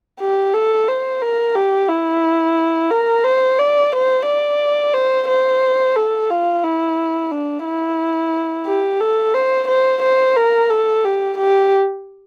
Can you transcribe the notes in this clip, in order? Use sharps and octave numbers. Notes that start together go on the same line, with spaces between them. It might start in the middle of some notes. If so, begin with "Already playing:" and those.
G4
A4
C5
A#4
G4
E4
A#4
C5
D5
C5
D5
C5
C5
A4
F4
E4
D4
E4
G4
A4
C5
C5
C5
A#4
A4
G4
G4